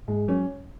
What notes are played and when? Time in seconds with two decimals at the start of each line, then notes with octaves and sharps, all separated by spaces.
0.08 G#2 G#3
0.28 F#3 C#4